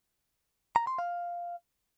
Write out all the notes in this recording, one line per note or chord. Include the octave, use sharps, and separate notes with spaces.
A#5
C6
F5